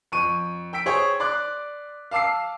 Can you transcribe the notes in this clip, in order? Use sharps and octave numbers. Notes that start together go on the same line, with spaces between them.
F2 C#6 D#7
G5 E6 B6 D7
G#4 C5 C#5 G5
D5 C6 D6 F#6
F5 A5 D6 E6 C7